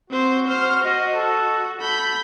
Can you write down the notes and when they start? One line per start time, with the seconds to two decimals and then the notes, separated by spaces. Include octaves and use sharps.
0.10 C4 F#4 C5
0.48 C5 F6
0.84 F#4 D#5
1.15 A4
1.81 A4 B5 G6